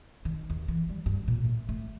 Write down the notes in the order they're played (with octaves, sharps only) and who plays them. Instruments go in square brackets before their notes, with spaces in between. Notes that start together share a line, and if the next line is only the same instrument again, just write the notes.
[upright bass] D#3
D#2
E3
G3
G2
A#2
A2
A3